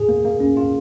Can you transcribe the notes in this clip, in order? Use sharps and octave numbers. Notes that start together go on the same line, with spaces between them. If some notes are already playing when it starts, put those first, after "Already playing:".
Already playing: A#2 G#4
A#3
A#3
C#4
F4